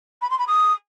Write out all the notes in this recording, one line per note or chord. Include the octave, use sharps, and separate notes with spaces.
B5
C6
B5
D#6